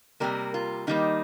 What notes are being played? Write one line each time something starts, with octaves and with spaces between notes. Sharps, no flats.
C3 G3 A#3 A#4
F4
D#3 G3 A#3 D#4